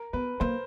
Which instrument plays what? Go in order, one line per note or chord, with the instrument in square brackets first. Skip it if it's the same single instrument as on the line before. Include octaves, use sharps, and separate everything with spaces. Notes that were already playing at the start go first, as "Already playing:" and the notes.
Already playing: [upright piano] A#4
[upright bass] B3 [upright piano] B4
[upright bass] A#3 [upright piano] C5